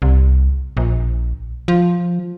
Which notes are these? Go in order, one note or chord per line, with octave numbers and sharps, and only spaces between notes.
C2
A#1
F3